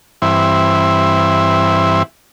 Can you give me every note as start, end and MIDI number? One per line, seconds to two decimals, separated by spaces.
0.22 2.03 43
0.22 2.03 52
0.22 2.03 60
0.22 2.03 64